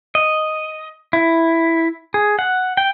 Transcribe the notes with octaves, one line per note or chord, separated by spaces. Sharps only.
D#5
E4
G#4
F#5
G5